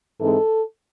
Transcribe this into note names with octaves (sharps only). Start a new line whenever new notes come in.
G#2 E3 G#3 C4 D#4 A4